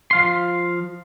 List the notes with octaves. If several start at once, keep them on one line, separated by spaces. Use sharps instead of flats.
F3 F5 C6